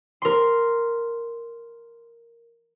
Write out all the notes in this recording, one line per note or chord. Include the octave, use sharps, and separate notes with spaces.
A#4 C6